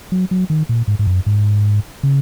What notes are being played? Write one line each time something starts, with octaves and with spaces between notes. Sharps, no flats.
F#3
F#3
D#3
A#2
G#2
G#2
F#2
G#2
C#3